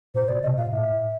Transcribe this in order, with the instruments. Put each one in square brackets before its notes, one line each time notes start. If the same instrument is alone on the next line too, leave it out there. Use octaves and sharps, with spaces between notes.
[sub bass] A#2 [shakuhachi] C5
[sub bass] B2 [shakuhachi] D5
[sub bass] C3 [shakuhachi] D#5
[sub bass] A#2 [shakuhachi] F5
[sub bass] A2 [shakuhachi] E5